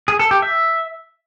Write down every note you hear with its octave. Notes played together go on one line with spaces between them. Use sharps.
G#4
A4
G4
E5